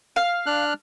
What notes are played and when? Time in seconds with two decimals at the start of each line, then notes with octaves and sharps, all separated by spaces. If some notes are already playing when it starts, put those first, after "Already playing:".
0.16 F5
0.46 D4 F6 F#6